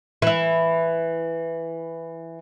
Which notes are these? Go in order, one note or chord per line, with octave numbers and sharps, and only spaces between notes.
E3 E4